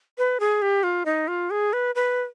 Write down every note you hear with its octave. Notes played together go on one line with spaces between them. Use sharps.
B4
G#4
G4
F4
D#4
F4
G#4
B4
B4